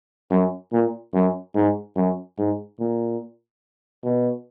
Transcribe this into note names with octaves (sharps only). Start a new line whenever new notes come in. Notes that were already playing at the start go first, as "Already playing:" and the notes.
F#2
A#2
F#2
G#2
F#2
G#2
A#2
B2